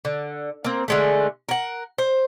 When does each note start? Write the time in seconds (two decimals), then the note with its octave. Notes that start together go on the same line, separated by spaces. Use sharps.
0.05 D3
0.65 A#3 C4
0.88 D3 G#3 A3
1.49 A#4 F#5
1.98 C5